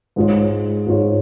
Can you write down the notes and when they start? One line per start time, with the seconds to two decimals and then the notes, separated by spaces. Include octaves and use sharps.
0.16 G#2 G#3 F4 C#5
0.87 G#2 G#3 F4 C#5